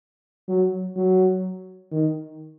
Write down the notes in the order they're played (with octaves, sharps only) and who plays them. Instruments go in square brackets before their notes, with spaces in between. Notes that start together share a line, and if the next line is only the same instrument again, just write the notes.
[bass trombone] F#3
F#3
D#3